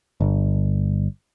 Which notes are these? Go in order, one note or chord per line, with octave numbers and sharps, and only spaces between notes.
G1